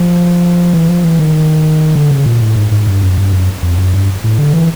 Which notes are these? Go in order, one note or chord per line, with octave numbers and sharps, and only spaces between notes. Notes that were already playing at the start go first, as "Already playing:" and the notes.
Already playing: F3
E3
F3
E3
D#3
D3
C#3
A#2
A2
G#2
G#2
G2
F#2
G2
F#2
F2
F#2
G2
A2
D3
E3